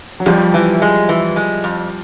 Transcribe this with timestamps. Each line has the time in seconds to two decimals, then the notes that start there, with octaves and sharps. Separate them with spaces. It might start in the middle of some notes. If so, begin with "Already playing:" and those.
0.20 F#3
0.26 F2 F3 G3
0.54 E3
0.82 G#3
1.09 E3
1.36 G#3
1.64 F2